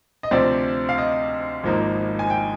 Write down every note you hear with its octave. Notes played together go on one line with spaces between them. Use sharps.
D#5
D2 C3 F3 C4 D5
F5
D#5
G#1 G#2 F3 A#3 D#4
G#5
G5